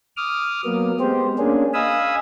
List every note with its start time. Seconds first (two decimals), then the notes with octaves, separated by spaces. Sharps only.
0.17 D6 D#6 F6
0.65 F#3 A#3 B3
1.00 G#3 B3 C4 G4 C5
1.38 A#3 C#4 D4 G#4
1.74 D#5 F5 G#5 B5 D#6 E6